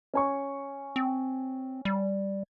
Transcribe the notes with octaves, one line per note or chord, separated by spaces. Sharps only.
C#4 G#5 C#6
C4
G3